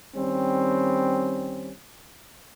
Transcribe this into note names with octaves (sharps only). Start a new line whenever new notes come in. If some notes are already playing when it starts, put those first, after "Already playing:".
D#3 G3 C4 C#4